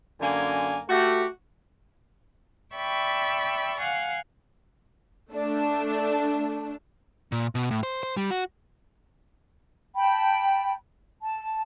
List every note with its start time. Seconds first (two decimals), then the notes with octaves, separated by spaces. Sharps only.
0.21 F#2 D3 A#3 G#5
0.89 A3 F#4 G4
2.75 D5 E5 G5 B5 C#6
3.79 F5 F#5 G#5
5.32 A3 D4
7.32 A#2
7.55 B2
7.71 A2
7.83 C5
8.03 C5
8.17 G3
8.31 F#4
9.96 G5 A5 B5
11.22 A5